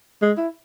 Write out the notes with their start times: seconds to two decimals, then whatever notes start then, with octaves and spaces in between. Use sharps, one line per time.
0.22 G#3
0.38 E4